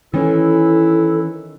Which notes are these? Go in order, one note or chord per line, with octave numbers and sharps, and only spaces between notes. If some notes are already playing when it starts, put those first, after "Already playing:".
D#3 E3 C#4 E4 A4